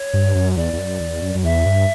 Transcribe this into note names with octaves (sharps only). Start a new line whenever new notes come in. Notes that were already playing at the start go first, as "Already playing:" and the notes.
Already playing: C#5
G2
F#2
E2 D5
E2
F#2
E2
F#2
F#2
E2 E5
G2